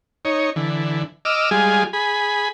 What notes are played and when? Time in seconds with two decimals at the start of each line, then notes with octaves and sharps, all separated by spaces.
0.25 D#4 C#5
0.56 D3 E3
1.25 D#5 D6 E6 F6
1.51 G3 G#3 F4 G#4
1.93 G#4 B5